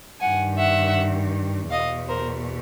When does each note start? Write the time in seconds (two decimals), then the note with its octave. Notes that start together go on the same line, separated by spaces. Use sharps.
0.20 G2 D#3 F#5 G#5
0.57 E5 F#5
1.70 E2 B2 D#5 F5
2.08 A#4 C5